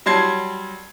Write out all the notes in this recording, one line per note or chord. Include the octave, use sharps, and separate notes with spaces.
F#3 G3 A5 C6 G#6 C7